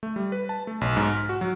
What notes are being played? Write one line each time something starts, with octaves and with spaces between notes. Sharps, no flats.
A3
G3
B4
A5
A3
B1
G#2
F6
F#4
F#3